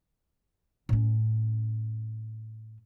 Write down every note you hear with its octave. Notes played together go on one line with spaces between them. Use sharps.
A2 C#4